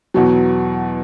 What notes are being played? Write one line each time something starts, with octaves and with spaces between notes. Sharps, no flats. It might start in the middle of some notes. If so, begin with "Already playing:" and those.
E2 B2 F#3